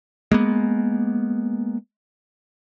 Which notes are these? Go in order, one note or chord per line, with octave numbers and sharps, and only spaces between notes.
G#3 A#3 B3